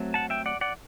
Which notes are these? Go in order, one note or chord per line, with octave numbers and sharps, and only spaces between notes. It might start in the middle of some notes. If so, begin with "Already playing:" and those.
Already playing: F#3 A3 C4
F#5 A5
E5 G5
D5 F#5
D5 F#5